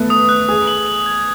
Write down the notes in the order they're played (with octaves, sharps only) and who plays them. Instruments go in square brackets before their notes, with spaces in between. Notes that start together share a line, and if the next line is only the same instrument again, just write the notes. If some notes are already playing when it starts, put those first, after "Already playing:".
Already playing: [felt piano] A3 B3 A4 B4
[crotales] D#6
F#6
[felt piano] G#4 [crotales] D#6
[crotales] F#7
F#7
G#6